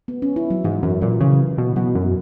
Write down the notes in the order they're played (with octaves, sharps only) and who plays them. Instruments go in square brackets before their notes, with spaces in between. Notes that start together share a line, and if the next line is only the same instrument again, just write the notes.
[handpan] B3
C#4
E4
F#3
[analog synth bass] G#2 [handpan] E3
[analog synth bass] F#2 [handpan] E3
[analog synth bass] A#2 [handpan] F#3
[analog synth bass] C#3 [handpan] E3
[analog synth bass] B2
[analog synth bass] B2 [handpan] F#3
[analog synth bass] F#2